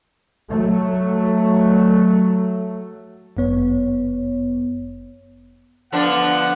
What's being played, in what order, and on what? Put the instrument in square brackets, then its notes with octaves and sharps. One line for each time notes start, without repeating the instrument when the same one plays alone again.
[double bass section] F#3 A3
[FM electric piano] G1 F#2 B3 C#5
[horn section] D3 B3 F#5 [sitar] F3 D4